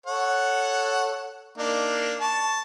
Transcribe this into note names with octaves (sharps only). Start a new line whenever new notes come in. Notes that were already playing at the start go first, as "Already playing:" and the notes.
A4 C#5 F#5
A#3 D4 D#4
A5 C#6